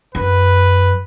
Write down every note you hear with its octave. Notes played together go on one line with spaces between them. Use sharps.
F#2 B4